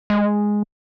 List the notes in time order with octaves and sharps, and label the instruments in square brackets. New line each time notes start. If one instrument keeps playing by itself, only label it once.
[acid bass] G#3